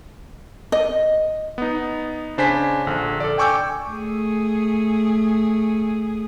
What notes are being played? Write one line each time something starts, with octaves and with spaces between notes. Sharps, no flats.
D#5
B3 D#4
C#3 D4 C5 G#5 B6
A#1 D3
A4 D5
G5 G#5 C#6 D6 E6 G6
A3 G#4